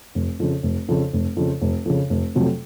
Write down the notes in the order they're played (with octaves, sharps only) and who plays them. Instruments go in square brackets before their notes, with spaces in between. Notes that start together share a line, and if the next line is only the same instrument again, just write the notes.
[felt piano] F1
F2 C#3
F1
F2 C#3
F1
F2 C#3
F1
F2 C#3
F1
F2 C3 F#3 A3